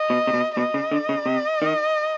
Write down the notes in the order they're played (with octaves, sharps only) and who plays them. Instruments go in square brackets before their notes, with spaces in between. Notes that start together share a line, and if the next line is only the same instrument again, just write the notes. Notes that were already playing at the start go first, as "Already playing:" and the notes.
Already playing: [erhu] D#5
[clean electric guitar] B2
C3
B2
[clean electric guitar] B2 [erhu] D#5
[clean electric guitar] C#3
D3
C#3
C3
D#3